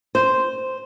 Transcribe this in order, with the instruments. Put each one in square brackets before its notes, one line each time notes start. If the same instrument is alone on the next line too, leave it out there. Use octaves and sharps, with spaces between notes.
[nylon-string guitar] C5